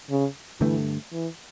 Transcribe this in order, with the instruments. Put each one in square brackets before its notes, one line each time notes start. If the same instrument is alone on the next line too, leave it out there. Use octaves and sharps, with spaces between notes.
[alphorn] C#3
[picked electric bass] G2 D3 A3 [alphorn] E3
[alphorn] E3